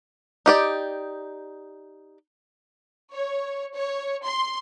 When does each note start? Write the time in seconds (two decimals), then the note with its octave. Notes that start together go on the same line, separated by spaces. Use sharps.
0.46 D#4 G4 D5
3.13 C#5
3.75 C#5
4.24 C6